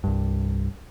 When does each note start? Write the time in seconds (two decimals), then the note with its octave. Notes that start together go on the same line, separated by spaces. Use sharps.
0.04 C2 G2